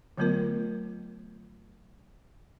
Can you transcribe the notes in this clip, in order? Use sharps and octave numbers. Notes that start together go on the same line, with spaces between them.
D3 F#3 A3 B3 F4 A#4